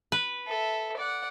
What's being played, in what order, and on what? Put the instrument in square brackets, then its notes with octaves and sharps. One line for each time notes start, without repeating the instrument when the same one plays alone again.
[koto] B4
[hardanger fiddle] A4 E5
D5 F#5